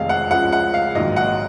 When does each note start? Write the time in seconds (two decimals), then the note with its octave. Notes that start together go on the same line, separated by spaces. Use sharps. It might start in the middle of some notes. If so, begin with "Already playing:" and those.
Already playing: F1 F2 D#3 G#3 F5
0.09 F#5
0.31 C#2 C#3 F3 G#3 F#5
0.52 F#5
0.74 F5
0.95 A#1 G#2 D#3 F#3 D#5
1.16 F#5